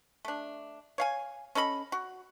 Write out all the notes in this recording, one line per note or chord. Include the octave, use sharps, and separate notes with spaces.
A3 D4
C#5 F5 G#5
C#4 A4 D#5 B5
F#4